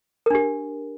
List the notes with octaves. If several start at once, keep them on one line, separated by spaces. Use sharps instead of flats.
D4 G4 A#4